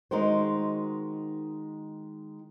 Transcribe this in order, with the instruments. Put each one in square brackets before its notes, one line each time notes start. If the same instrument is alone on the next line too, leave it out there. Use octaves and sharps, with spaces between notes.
[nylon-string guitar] D#3 G#3 D#4 F#4 A#4 C5